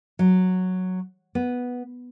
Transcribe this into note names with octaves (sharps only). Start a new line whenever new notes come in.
F#3
B3